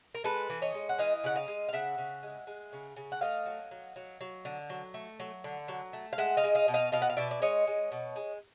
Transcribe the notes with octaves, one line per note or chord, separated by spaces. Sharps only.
A#4
G#3 A4 B4
E3
C#5 D#5
G#3
F#5
E3 D#5 F5
C#3 F#5
D#5 F5
G#3
F5
C#3 E5 F#5
C#3
G#3
G#3
C#3
C#3
F#5
A3 D#5 F5
F#3
F#3
F#3
F#3
D3
F#3
A3
F#3
D3
F#3
A3
F5
G#3 E5 F#5
D#5 F5
G#3
D#5 F5
B2
D#5 F5
B2 D#5 F5
F#5
F5
B2 D5 E5
D5
G#3 C#5 D#5
G#3
B2
G#3